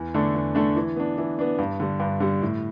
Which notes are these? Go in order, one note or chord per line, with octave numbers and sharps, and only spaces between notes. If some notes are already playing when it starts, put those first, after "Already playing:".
Already playing: E2
D3 A3 D4
E2
D3 A3 D4
E3
B3 D4
E3
B3 D4
G2
D3 G3
G2
D3 G3
A2